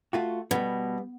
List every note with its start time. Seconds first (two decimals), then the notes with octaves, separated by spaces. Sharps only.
0.13 A3 F4 F#4
0.51 B2 G3 B3